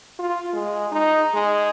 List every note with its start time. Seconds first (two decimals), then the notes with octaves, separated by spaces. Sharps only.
0.19 F4
0.53 G#3
0.92 D#4
1.34 G#3